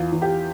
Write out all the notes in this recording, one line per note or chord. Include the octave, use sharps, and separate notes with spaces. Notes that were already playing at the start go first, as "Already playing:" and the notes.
Already playing: E2 F4
E2
G4